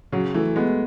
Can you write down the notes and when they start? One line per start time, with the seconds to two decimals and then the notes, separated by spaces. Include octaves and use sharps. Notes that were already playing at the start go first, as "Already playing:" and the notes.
0.12 C#3 F#3
0.34 E3 A3
0.56 G#3 B3